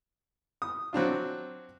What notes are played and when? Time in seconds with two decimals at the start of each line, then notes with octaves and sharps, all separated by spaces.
0.62 D#6
0.93 F#3 C4 D4 F4